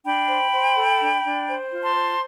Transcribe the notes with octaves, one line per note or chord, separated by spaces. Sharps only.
D4 G5 B5
C5
C5
A4
D4
D4
C5
F4
A5 C6
C5